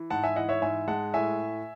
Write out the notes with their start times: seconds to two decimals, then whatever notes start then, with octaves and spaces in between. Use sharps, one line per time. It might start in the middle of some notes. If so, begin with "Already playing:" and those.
Already playing: E3
0.10 G#2 F#5 A5
0.23 E5 G#5
0.36 E3 D#5 F#5
0.49 C#5 E5
0.62 G#2 E5 G#5
0.88 G#3 F#5 A5
1.14 A2 E5 G#5